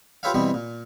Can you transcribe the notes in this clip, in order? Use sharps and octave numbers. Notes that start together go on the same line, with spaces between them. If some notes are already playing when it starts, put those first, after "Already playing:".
F4 G4 B4 C#5 E5 F5
B2 E3 G3 B3 C4
A#2